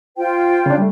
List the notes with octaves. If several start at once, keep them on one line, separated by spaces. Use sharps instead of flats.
F4 C5 G5
C#3 D4
G3 A3